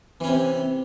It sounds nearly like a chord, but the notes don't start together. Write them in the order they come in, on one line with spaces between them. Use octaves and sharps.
E3 C#4 C3